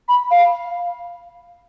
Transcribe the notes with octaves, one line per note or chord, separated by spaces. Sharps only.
B5
F5